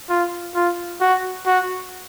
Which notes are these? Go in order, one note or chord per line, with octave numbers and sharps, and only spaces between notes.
F4
F4
F#4
F#4